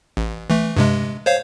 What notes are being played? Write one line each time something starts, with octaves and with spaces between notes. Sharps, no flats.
A1
E3 A3
G2 C3 G#3
C5 C#5 F5